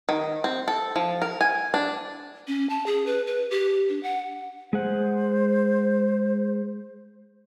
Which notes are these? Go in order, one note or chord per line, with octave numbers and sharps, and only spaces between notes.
D#3
C4
A4
F3
A#4
G#5
D4
C#4
A5
G#4
B4
B4
G4
D4
F#5
G#3 G#4 C5 F#5